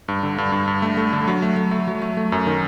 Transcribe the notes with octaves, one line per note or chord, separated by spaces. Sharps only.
G2
D3
G2
G2
G2
A3
A3
D3
F#3
A3
A3
A3
F#3
A3
A3
F#2
D#3